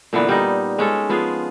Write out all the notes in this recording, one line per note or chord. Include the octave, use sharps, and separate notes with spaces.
A#2 D3 E3 B3
G3 D#4
G#3 C#4 A4
F3 B3 F4 G#4